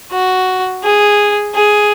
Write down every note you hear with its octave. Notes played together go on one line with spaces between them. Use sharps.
F#4
G#4
G#4